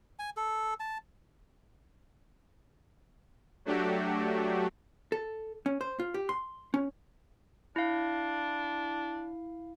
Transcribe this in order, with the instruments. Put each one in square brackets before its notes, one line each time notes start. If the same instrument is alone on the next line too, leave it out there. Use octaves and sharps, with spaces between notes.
[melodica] G#5
A4
A5
[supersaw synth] F#3 A3 D4 F#4 G4
[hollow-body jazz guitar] A4
C#4
C5
F4
G4
C6
C#4
[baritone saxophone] D4 [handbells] E4 F5